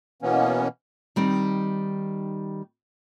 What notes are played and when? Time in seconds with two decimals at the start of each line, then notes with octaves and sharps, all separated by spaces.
0.22 B2 E3 A#3 B3 C#4
1.16 D#3 G3 C4 D#4